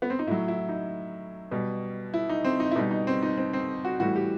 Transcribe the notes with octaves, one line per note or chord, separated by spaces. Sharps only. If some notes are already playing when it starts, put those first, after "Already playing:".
B3
C4
D#4
A2 F#3 E4
E4
D#4
B2 G3
E4
D#4
C4
D#4
E4
B2 G3 D#4
D#4
C4
D#4
C4
C4
F#4
A2 E3 G3 F#4
G4